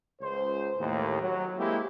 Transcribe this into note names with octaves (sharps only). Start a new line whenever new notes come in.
C#2 C5
D#2 A2
F#3
G#3 A#3 C4 E4 G4